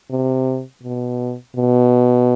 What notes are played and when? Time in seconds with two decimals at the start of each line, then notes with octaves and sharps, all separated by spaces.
0.11 C3
0.83 B2
1.57 B2